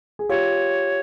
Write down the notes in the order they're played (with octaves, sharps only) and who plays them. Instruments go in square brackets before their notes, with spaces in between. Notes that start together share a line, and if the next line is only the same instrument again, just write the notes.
[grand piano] G#4
[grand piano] F4 G4 [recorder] C#5